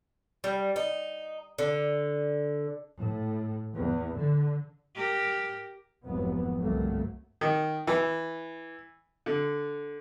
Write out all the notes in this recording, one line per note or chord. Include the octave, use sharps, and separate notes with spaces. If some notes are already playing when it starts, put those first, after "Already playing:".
G3
D#4
D3
A2
E2
D3
G4 A#4
F1 D#2 G#2 F#3 B3
G1 C2 F#3 A3 A#3
D#3
E3
D3